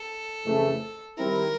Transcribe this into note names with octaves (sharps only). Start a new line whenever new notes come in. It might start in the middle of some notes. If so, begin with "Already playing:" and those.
Already playing: A4
F2 C#3 E3 A3
D#3 G3 C4 E4 A#4